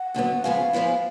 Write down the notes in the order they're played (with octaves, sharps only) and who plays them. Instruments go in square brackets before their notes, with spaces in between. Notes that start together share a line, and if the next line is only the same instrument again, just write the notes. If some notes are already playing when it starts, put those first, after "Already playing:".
Already playing: [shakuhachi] F#5
[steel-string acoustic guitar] D#2 D3 F#3 B3
[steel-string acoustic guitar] C#3 F3 G#3 B3 [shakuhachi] F5
[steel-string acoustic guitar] G#2 F3 G#3 B3 E4